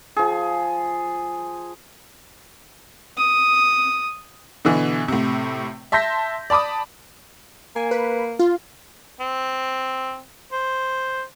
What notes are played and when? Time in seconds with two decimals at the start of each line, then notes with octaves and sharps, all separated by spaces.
0.16 F3 G#4
3.17 D#6
4.65 B2 D3 E3
5.08 A2 C3
5.92 E5 A5 C6 G6 A#6 B6
6.50 D5 A5 B5 D6 D#6
7.76 A#3 G#5
7.91 B4
8.39 F4
9.20 C4
10.52 C5